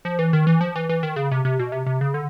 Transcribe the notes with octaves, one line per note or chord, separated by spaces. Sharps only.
F3
E3
D#3
E3
F3
E3
E3
D#3
C#3
C3
C3
B2
C3
C3
C#3
D3